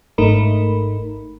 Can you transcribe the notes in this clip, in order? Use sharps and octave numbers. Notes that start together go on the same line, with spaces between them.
G#1 G#2 A3 D#4 A#4 B5